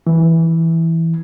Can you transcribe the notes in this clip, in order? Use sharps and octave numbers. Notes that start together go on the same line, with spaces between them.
E3